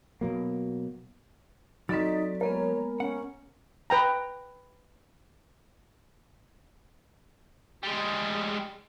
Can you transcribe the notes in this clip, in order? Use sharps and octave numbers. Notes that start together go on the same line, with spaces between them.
B2 F#3 A#3
F#3 C4 D#4 A4 D5 A6 B6
G#3 A#3 B3 A#4 C#5
C#4 F#5
B4 G5 A#5
G3 G#3